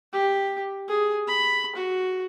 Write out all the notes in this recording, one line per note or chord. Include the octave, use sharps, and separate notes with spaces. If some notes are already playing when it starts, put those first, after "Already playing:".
G4
G#4
B5
F#4